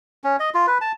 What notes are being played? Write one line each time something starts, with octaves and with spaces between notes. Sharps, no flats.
C#4
D#5
F4
B4
A5